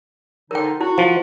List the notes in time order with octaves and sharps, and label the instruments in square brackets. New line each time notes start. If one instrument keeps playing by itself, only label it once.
[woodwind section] D3 F3 D#4 [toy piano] A#4 G5
[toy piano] E4 [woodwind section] F#4
[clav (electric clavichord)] F3